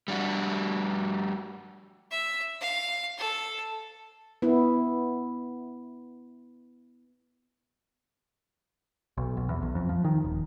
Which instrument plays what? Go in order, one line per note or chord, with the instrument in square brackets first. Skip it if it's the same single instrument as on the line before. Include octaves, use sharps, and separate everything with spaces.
[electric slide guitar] G3 D4 F#4
[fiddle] E5
F5
A4
[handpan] B3 E4
[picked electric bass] B1
B1
E2
B1
F2
F3
D#3
D#1